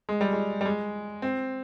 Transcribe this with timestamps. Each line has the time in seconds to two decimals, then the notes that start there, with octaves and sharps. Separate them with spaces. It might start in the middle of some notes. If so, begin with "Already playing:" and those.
0.09 G#3
0.21 G3
0.33 G#3
0.61 G3
0.66 G#3
1.22 C4